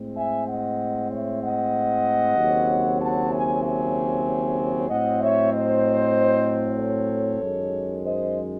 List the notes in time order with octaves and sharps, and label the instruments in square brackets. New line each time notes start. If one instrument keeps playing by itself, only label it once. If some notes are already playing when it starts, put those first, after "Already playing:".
Already playing: [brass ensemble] A2 G#3 C4
E5 G#5
D#5 F#5
C#5 E5
D#5 F#5
D#2 C#3 F#3 C4
F#5 A5
E5 G#5
E5 G#5
A2 F#3 C4 D#5 F#5
C#5 E5
C5 D#5
A4 C#5
F#2 D#3 G#3
C5 D#5